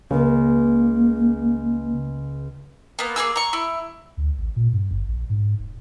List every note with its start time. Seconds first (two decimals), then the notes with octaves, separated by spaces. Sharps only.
0.11 C#2 C#3 A#3
2.99 A#3 B3
3.16 A#3 C4 G#4 E6
3.36 A#5 C#6
3.53 E4
4.17 D2
4.38 A1
4.56 A#2
4.73 G2
4.91 G1
5.07 A#1
5.30 G#2
5.59 D#1